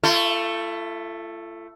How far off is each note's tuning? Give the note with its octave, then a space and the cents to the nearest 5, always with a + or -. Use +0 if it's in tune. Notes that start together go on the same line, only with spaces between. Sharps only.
A3 +5 F4 -40